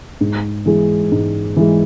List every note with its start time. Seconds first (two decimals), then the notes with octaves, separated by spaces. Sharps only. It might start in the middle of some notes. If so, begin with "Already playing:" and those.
0.21 G#2
0.66 E3 G#3
1.12 G#2
1.56 E3 G#3